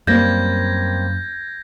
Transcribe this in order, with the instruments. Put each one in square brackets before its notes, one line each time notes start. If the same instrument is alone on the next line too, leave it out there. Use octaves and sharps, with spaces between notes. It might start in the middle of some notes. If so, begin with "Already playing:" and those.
[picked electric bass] F#2 [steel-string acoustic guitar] G3 A#3 C4 [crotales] G6 G#6 A#6